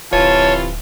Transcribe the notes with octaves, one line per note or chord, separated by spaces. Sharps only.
D1 C3 E3 F4 C#5 A5